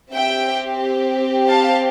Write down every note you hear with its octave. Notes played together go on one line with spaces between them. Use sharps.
C4 G4 E5 G5
F5 A5